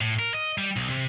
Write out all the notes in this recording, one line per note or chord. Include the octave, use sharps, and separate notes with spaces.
A2
A#4
D#5
G3
B1
C3